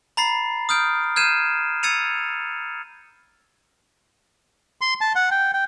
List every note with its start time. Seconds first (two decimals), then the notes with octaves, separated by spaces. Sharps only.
0.17 A#5 B5 A6 C7
0.69 D#6 F6 G6 D7
1.16 F6 G6 G#6 C7 D#7 E7
1.83 E6 G#6 A6 C#7 D#7 F7
4.81 C6
5.01 A5
5.15 F#5
5.31 G5
5.54 G5